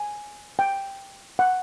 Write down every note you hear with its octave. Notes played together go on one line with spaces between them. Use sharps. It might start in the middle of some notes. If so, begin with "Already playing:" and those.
Already playing: G#5
G5
F#5